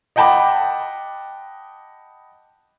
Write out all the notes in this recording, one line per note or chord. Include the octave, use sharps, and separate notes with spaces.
D#5 F#5 G5 A5 B5 D6